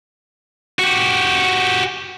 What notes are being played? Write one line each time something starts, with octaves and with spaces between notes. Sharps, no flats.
F#4 G4